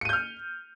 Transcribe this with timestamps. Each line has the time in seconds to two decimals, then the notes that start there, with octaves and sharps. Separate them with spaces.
0.01 C#7
0.05 D#7
0.09 G6
0.13 F6